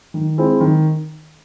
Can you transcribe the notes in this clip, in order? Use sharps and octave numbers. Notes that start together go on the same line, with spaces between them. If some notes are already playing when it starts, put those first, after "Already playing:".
D#3
G#3 C4 E4
D#3